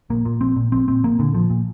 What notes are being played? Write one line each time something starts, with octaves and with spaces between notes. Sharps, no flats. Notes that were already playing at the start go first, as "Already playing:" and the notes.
A#1 A#3
A#2
A#1 C4
A#2
A#1 C4
A#2 C4
A#1 A#3
A#2 D3
A#1 F3
A#2